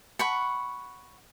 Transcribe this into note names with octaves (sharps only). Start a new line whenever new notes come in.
F#5 B5 C#6